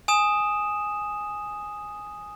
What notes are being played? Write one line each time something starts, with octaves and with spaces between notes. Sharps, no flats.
G#5 D#6 E7